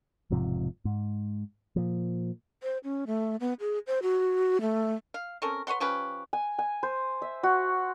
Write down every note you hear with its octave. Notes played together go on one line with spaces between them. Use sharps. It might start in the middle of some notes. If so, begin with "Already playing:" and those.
E1 G#2 C3 F3
G#2
A#2 F3
C5
C#4
A3
B3
G#4
C5
F#4
A3
F5
C4 C#4 A4 A#4
B4 C#5 F#5 C6
F3 C#4 G4 B4
G#5
G#5
C5
E5
F#4